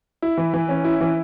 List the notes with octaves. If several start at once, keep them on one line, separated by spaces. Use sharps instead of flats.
E4
E3
E3
C#4
E4
E3